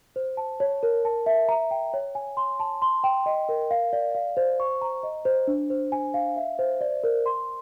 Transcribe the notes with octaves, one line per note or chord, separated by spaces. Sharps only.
C5
A5
C#5
A#4
A5
E5
A#5
G5
C#5
G#5
C6
A5
C6
G5
D#5
A#4
F5
D5
F5
C5
C#6
A#5
D#5
C5
D4
C5
G#5
F5
E5
C5
D5
A#4
C6